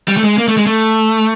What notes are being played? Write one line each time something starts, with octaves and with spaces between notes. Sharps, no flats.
G3
A3
G#3
A#3
A3
G#3
A3